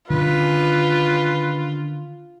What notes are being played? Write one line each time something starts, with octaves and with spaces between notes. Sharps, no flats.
D3 D#3 C#4 F4 B4